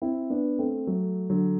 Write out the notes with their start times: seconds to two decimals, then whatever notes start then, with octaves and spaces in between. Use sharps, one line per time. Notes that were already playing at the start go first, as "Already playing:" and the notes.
0.02 C4 E4
0.30 B3 D4
0.58 A3 C4
0.87 F#3 A3
1.30 D3 F#3